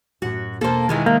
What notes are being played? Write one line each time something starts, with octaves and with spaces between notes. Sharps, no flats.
F#2 A2 F#3 F#4
E1 A#3 A4 C5
D#3 E3 G#3 F4
C3 G#3 A#3